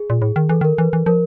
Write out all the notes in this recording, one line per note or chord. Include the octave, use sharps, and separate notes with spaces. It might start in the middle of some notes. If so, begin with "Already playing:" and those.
Already playing: G#4
A#2
A2 G#4
D#3
E3 A4
D#3 A#4
E3 B4
E3
F3 A#4